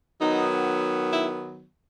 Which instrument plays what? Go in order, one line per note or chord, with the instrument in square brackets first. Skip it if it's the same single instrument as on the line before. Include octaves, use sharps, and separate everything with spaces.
[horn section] D#3 F#3 B3 D#4
E4